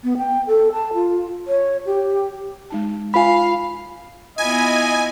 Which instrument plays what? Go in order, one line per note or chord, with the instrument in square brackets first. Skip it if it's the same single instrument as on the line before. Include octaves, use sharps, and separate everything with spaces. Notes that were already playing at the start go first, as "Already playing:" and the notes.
[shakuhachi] B3
G5
A4
A5
F4
C#5
G4
[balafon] G#3 D#4 A5
[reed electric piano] F4 B5 [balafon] B4 E5 G#5 [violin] F5
[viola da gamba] B3 E4 F4 [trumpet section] D#5 [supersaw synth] G#5